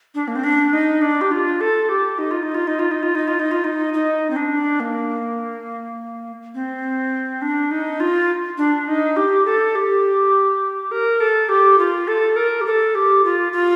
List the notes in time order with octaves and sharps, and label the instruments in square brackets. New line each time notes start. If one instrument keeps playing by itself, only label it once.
[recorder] D4
A#3
C4
D4
D#4
D4
G4
F4
A4
G4
D#4
F4
D#4
F4
D#4
F4
D#4
F4
D#4
F4
D#4
F4
D#4
D#4
C4
D4
A#3
C4
D4
D#4
F4
D4
D#4
G4
A4
G4
A#4
A4
G4
F4
A4
A#4
G4
A4
G4
F4
F4